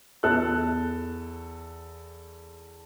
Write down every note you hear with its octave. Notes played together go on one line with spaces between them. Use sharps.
E2 A4 F#6